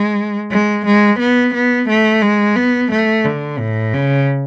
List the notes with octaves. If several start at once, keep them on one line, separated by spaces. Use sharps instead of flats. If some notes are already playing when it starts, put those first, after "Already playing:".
Already playing: G#3
G#3
G#3
B3
B3
A3
G#3
B3
A3
D3
A2
C#3